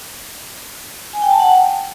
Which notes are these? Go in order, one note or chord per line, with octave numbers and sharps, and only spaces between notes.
G#5
G5
A5
F#5